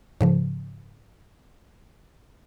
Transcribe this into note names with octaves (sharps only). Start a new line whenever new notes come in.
G#2 C#3 F3